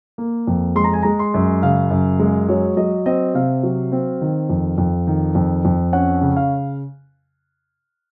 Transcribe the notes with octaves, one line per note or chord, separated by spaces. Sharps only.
A#3
F2
G#3 C6
A#5
G#5
G#3 A#5
C6
F#2
C#3 F5
F#2
G#3
F#3 C#5
F#3 D#5
C4 D#5
C3 F5
F#3
C4
D#3
F2
F2
D#3
F2
F2
C#4 F#5
C#3
F5